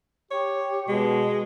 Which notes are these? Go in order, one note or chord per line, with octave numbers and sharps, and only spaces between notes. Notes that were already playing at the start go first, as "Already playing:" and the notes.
G4 C#5
B2 G#3